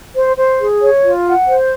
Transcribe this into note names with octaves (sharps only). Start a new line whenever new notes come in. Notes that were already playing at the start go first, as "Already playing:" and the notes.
C5
C5
G#4
C#5
F4
F#5
C5